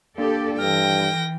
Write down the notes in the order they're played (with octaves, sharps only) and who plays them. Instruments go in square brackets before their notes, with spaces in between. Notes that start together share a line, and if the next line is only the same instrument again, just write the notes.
[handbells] A#3 D4 [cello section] G4 A4 D5
[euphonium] G2 [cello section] E3 [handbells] A4 F6 [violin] G5 A#6